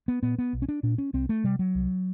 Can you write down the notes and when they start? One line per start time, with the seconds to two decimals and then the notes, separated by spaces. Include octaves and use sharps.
0.08 B3
0.23 A#2 B3
0.38 B3
0.53 B1
0.62 C#4
0.69 D4
0.83 A#2 D4
0.98 C#4
1.13 C2 C4
1.29 A3
1.44 C3 G3
1.59 F#3
1.75 C2